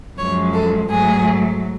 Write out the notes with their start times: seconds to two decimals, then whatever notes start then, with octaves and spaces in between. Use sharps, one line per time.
0.18 F#2 F3 G#3 C#5
0.54 A4
0.90 G#2 F#3 A3 G#4